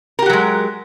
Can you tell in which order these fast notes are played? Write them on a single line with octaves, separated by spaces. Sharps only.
A#4 G4 F#4 F#3 G#3